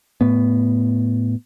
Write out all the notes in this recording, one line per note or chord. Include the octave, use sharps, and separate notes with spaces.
A2 B3